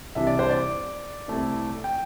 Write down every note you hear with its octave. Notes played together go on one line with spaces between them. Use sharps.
C2 C3 E3 G3 D4 E5
D5
C5
D5
C2 C3 A3 E4
G5